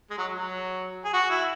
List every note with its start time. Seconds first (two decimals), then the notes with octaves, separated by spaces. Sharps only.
0.11 G#3
0.18 F#3
0.33 F#3
1.04 G#4
1.13 F#4
1.30 E4